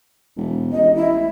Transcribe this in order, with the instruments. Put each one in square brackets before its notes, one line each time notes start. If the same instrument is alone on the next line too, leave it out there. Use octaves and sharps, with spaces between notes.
[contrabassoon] E1
[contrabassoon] A1 [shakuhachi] D#5
[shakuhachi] E4